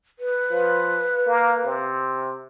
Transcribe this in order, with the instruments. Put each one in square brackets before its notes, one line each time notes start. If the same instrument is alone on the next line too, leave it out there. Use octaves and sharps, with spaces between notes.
[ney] B4
[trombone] F3
A#3
C3